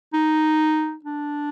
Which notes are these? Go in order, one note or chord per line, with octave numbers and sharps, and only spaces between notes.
D#4
D4